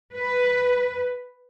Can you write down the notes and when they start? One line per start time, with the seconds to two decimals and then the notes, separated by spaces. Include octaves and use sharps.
0.14 B4